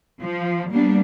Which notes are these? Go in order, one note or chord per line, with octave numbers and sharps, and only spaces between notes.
F3
G3 A#3 B3 D4